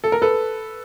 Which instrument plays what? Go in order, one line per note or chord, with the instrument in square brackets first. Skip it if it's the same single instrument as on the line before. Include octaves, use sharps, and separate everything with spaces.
[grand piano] A4
A#4
A4 B4